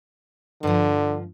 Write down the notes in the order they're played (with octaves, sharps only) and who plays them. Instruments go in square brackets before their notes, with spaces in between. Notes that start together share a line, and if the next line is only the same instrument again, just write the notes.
[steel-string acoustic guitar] G2 F3 [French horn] D3